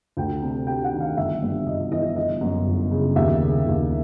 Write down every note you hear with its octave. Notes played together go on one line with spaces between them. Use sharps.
D2 G5
C3
G3 G5
F#5
D#3
F5
G1 E5
G2
G1 D#5
E3 D#5
G1 D#5
F#2
G1
C#3
D#2 E5
C#3
D#2